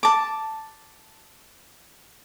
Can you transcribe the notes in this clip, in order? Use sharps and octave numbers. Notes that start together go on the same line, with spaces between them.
A5 D6